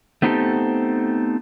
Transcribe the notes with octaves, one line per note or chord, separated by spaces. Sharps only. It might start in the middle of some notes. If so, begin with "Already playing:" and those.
A3 B3 C4 D#4 G4 A4